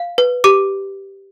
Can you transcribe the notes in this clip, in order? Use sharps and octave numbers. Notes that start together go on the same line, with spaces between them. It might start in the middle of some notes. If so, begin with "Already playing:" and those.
Already playing: F5
B4
G4 D6